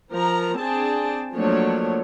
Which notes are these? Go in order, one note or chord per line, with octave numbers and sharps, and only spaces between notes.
F3 A#4 A#5
C4 D4 G#4 D5 G5 A5
F3 F#3 A3 A#3 D4 C#5